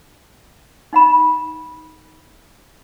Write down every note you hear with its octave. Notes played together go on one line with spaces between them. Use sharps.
D#4 F#5 B5